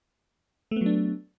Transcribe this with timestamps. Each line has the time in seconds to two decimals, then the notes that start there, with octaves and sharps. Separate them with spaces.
0.71 A3
0.76 B3
0.81 F#3
0.86 D4